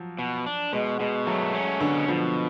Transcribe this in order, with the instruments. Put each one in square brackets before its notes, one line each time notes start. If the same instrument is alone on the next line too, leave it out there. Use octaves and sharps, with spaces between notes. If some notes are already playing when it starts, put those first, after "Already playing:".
Already playing: [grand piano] F3 F#3
[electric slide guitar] B2
D4
[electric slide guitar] B2 [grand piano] G#3
[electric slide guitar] B2 [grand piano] G#3
[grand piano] F#3 [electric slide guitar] A3
[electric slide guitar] C#4
[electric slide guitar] B2 [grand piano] D3
[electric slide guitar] B2 [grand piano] F3